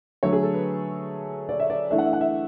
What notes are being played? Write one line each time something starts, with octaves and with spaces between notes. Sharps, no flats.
D3 F#3 A3 C#5
G#4
A4
B4
D5
E5
D5
E3 A3 D4 E5
F#5
E5
F#5
E5